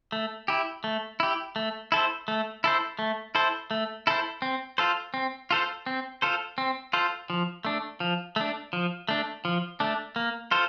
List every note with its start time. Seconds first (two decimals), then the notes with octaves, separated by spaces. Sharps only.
0.12 A3
0.48 E4 G4
0.84 A3
1.20 E4 G4
1.56 A3
1.92 E4 A4 C5
2.28 A3
2.64 E4 A4 C5
2.99 A3
3.35 E4 A4 C5
3.71 A3
4.07 E4 A4 C5
4.42 C4
4.78 F4 A4 C5
5.14 C4
5.51 F4 A4 C5
5.86 C4
6.22 F4 A4 C5
6.58 C4
6.93 F4 A4 C5
7.30 F3
7.65 A3 D4
8.00 F3
8.36 A3 D4
8.73 F3
9.09 A3 D4
9.45 F3
9.80 A3 D4
10.16 A#3
10.51 F4 A4 C5